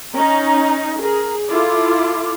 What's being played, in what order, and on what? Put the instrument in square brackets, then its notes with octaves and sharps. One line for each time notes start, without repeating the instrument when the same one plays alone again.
[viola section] C#4 D#4 [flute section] A#5
[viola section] G#4 [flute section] A#4 A#5
[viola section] E4 F4 A4 [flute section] D6